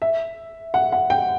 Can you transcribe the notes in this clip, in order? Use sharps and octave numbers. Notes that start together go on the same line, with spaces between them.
E5
F#5
F#5
G5